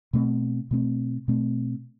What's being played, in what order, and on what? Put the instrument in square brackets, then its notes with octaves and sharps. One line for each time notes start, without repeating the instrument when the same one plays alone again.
[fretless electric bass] B2 A3 C4
B2 A3 C4
B2 A3 C4